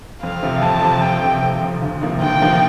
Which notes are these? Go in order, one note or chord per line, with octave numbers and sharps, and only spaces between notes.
F2 F5
C3 F3
F2 A5
C3 F3
F2 G5
C3 F3
F2
C3 F3
D2
C3 F3 A#3 D#4
D2 G5
C3 F3 A#3 D#4